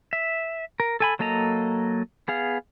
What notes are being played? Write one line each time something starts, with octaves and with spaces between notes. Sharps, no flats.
E5
A#4
A4 G#5 B5
F#3 A#3 A4 D#5 A#5
B3 G#4 F5